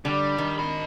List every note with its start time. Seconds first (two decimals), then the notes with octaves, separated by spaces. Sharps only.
0.05 D3 G3
0.38 D#3
0.59 D#5 B5